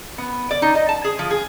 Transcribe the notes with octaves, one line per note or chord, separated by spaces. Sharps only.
B3
D5
D#4
D#5
A5
G#4
F3
G#4